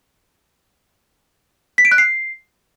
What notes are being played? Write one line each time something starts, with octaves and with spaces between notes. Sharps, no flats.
B6
D7
F#6
C7